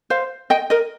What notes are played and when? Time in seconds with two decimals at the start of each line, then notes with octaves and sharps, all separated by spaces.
0.10 C5 F5
0.50 D#5 G5
0.70 A#4 D#5